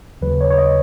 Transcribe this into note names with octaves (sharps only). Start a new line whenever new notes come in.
D#2 C#3 F#3 B4
C#5
C#5
D#5